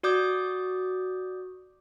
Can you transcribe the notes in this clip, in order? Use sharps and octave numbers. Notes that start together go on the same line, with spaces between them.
F#4 D5 D6 D#6 G6